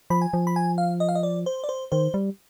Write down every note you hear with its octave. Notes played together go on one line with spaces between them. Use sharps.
F3 B5
G#5
F3
B5
G#5
F5
D#5
F5
D#5
D5
C5
D5
C5
D#3 C5
G3